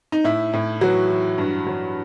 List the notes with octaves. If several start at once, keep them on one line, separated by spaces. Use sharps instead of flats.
D#4
A2 E4
A2
E3 F#3 F#4
E3
G2
F#3